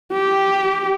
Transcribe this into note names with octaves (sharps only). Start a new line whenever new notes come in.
G4